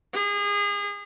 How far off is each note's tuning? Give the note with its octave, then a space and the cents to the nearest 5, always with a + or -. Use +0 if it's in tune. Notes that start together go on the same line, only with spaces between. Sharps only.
G#4 -30